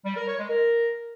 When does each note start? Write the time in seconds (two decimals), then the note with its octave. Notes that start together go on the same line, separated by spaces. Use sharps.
0.05 G3
0.16 A#4
0.27 C#5
0.38 G#3
0.49 A#4